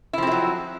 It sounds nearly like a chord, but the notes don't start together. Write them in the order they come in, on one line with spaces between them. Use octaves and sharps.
E4 F3 C4 G#3 F#3